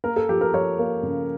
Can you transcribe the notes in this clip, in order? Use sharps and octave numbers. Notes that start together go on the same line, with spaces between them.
A#3 A#4
A4
F3 G4
A#4
F3 C#5
A#3
C#3